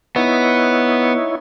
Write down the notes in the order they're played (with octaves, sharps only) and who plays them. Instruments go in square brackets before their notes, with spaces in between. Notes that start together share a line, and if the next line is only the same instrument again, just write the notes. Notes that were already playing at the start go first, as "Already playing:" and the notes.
[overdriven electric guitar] B3 [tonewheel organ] D#4 E4 C#5